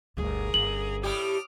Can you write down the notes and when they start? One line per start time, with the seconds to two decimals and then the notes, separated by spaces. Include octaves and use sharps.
0.17 G1 D2 G#4 A#4
0.54 G1 C#4 F#7
1.03 A2 G3 G4 D6 D#6 F6